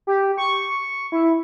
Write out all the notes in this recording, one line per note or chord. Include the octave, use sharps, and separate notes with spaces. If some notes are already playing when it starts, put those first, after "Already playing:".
G4
C#6
E4